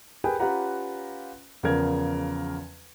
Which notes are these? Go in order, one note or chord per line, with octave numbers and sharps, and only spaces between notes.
G4 G#4 A#4 B4 G5 G#5
C#4 F4 G4 B4 F#5 A#5
E2 C#3 F3 A#4 G#6